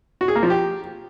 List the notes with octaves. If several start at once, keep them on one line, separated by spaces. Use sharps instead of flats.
F#4
G#4
A#3
F3
G4